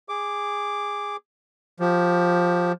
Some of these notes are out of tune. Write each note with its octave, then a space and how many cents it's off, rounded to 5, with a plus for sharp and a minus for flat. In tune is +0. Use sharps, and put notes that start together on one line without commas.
G#4 -15 D6 +0
F3 +15 G4 +0